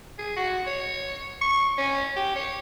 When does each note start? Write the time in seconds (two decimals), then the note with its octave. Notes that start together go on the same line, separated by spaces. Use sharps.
0.19 G#4
0.36 F#4
0.67 C#5
1.41 C#6
1.78 C#4
2.16 G4
2.36 C#5